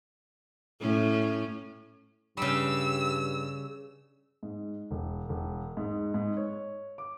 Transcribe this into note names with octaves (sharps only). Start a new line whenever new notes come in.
A2 C#4
G2 C#3 G3 E6
G#2
E1
E1
G#2
G#2
C#5
D6